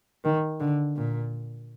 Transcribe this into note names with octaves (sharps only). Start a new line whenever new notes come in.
D#3
D3
A#2